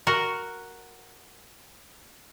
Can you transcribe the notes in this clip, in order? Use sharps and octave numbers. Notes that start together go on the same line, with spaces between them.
F#4 A#4